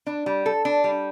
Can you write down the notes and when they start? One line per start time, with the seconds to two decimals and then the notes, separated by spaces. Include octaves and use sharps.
0.07 D4
0.26 G3
0.46 A4
0.65 D4
0.84 G3